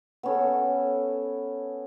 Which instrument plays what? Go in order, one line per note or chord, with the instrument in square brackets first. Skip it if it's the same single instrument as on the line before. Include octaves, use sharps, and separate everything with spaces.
[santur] B3 C#4 A4